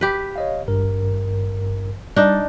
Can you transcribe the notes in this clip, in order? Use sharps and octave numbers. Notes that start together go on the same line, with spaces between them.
G4 B4
C#5 D#5 F5
G#1 G2 A#4
G3 D4 D#4 D5